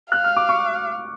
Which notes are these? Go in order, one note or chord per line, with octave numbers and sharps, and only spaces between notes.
F5 F#6
F6
D6
C#6